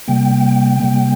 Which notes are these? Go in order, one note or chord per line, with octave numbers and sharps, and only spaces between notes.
C3 G3 A#3 G5
C3 G3 A#3